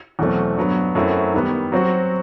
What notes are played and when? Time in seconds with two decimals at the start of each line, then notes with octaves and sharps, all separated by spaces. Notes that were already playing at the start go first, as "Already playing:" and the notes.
0.19 E2 B2 F#3 A3 C4
0.57 G2 F#3 B3
0.95 F#2 F#3 A3 C4 E4
1.33 D#3 G3 B3
1.72 F#3 C4 F#4